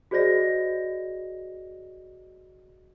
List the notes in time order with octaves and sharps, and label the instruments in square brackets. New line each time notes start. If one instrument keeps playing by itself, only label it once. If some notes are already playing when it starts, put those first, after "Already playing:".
[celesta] F#4 G#4 C5 D5 D#5 A#6